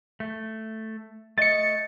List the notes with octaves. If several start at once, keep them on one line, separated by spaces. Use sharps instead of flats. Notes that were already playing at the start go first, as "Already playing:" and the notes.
A3
A3 D#5 A6 C#7